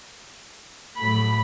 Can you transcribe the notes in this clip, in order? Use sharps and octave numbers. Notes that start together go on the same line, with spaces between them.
A2 F#3 A3 B5